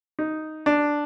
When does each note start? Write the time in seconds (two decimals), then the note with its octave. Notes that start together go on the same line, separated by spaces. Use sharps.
0.19 D#4
0.66 D4